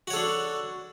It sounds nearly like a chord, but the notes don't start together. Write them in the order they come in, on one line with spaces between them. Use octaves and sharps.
F#4 C#5 A4 D4